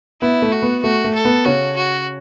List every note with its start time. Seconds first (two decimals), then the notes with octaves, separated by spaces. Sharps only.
0.21 B3 E4
0.42 A3
0.52 F#4
0.62 B3
0.83 A3 F#4
1.04 A3
1.15 A4
1.25 B3
1.45 C#3 C#4 F#4
1.76 F#4